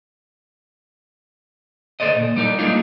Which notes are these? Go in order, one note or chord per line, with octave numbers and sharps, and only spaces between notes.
D2 F3 A4 C5 D5 D#5
A#2
G3 D#4 A#4 D5
G3 G#3 A#3 D4 D#4 F4